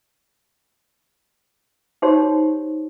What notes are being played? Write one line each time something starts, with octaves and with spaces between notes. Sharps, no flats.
D#4 F#4 G4 C5 C#5